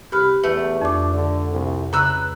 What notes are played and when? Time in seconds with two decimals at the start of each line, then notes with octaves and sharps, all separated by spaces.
0.12 C2 G4 B4 F6
0.44 E2 A3 B4
0.81 F2 D4 D6
1.14 D3
1.52 C2
1.93 C#2 C#3 B4 A#5 E6 F#6